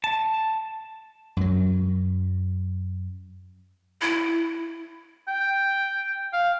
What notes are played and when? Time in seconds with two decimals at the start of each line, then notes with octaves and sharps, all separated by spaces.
0.04 A5
1.37 F#2 F#3
4.01 E4
5.28 G5
6.33 F5